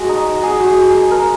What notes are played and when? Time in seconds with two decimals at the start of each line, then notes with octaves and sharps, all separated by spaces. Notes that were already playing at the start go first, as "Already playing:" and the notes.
Already playing: G#3 F#4
0.09 D#4
0.27 D#4
0.43 D#4 G#4
0.60 G#3 F#4
0.66 G#4
0.77 G#3
0.89 G#4
0.94 G#3
1.11 G#3 A#4